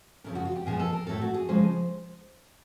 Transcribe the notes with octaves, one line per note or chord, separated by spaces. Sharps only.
F#2 C#3 F3 A#4
F#4
F4
G4
A#2 F3 G#3 B3 G#4
A4
A#4
A2 F#3 A3 C4 A4
F#4
G#4
C#3 F3 G#3 C5